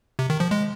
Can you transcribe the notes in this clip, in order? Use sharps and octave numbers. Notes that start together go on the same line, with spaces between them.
C3
D#3
F3
G#3